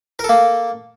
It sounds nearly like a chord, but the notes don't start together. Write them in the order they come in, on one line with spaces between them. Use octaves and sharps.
A#4 A4 A#3